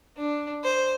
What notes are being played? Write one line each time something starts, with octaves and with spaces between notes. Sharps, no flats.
D4
C5